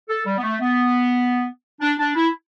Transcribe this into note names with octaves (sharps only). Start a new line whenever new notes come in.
A4
G3
B3
A3
B3
D4
D4
E4